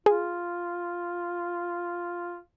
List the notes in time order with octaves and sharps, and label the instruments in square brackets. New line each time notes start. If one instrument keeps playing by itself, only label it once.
[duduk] F4 [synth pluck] G#4